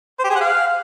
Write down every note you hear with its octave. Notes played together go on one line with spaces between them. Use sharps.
C5
G4
G#4
F#5
F5